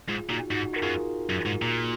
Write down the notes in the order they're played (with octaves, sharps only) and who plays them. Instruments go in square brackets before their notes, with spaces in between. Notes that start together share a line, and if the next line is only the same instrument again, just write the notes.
[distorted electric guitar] G#2 [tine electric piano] F4 G#4
[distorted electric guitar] A#2 [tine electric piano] D#4 F#4
[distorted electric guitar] G#2 [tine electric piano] D#4 F#4
[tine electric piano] A#4
[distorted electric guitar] F#2 [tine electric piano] F4 G#4
[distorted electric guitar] F#2
G#2
A#2